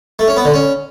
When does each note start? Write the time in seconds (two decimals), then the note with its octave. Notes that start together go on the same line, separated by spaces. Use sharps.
0.19 A3
0.28 C#4
0.36 B3
0.45 D3
0.54 C#4